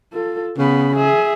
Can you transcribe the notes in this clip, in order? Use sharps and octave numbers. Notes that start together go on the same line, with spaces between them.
F4 A4
C#3 B3 B5
G#4 E5